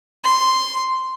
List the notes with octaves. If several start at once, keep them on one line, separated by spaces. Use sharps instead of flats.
C6